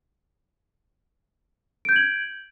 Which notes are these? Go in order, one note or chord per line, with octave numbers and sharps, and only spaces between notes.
G6 G#6 D7 F#7